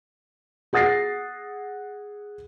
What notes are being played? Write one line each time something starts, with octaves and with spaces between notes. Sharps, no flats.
G#4 F#5 D#6 A6 A#6 C7